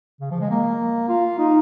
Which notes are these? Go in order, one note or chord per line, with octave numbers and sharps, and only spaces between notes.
C#3
F3
G#3
A#3
F4
D#4